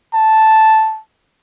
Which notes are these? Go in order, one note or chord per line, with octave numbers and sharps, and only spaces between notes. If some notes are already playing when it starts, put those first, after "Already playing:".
A5